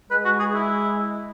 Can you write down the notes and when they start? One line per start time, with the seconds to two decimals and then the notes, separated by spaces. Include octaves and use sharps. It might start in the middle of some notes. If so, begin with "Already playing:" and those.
0.10 G#3 B4
0.25 F#4
0.40 G#4
0.54 E4